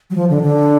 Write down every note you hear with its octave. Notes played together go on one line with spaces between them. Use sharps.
F#3
F3
D3
D3